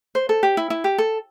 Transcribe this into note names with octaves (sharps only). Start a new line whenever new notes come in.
C5
A4
G4
E4
E4
G4
A4